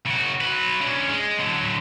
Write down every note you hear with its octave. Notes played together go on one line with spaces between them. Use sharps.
C#3 F#4
F#3 B4
D3 C#4
G#3
D3 F#3